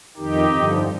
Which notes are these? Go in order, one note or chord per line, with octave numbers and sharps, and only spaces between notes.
F2 D#3 D#4 G4
G2 D3 F3